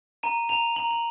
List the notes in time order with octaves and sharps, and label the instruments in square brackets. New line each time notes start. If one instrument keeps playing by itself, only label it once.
[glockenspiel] A#5 D#7
A#5 F7
A#5 F#7
F#7